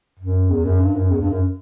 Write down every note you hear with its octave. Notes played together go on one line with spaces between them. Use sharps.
F#2
E2
F#2
G2
F#2
E2
G2
F#2